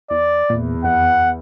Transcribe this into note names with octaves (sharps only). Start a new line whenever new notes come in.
E2 D5
E2 A#2
F2 F#5